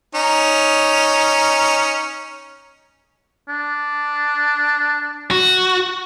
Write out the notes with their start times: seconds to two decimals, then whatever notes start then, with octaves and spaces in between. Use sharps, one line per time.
0.15 C#4 D#4
3.48 D4
5.31 F#4